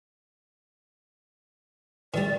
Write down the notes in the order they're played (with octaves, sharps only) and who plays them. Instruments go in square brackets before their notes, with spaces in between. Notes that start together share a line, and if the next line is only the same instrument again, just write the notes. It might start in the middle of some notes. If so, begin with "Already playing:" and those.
[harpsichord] D#3 G3 [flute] D5